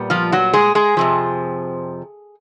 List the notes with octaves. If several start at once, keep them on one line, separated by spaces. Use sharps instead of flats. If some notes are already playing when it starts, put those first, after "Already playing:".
Already playing: A#2 G3 B3
F3 F4
F#3 F#4
G#3 G#4
G#3 G#4
F2 C3 F3